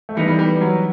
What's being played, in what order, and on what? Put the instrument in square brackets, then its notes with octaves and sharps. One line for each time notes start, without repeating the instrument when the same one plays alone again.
[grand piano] A3
[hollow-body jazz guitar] E3 B3 D#4 [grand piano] G3
[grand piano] G3
G3
F#3